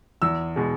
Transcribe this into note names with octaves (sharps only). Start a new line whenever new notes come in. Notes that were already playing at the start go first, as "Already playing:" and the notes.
E2 E6
B2 G#3